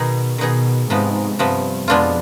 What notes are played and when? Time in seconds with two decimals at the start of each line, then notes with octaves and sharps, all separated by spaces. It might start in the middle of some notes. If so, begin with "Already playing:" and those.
Already playing: B2 D#3 B3 D#4 G#4
0.38 B2 D#3 B3 D#4 G#4
0.89 G#2 C3 F3 B3
1.39 G2 C3 F3 B3
1.88 F2 B2 G#3 B3 D4 F4